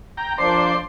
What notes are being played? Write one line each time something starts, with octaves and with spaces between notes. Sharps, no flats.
G5 A#5
F3 A#3 D4 C5 D5 C6